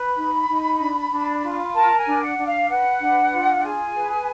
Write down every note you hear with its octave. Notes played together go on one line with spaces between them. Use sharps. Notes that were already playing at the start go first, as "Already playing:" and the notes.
Already playing: B4 B5
D#4
D#4
D4
D4
F4
A#4 A5
G#5
D4
F#5
D4
F5
B4 F#5
D4
F4
G#4 G#5
B4